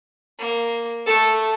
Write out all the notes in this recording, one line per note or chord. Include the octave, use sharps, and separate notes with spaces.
A#3
A3 A4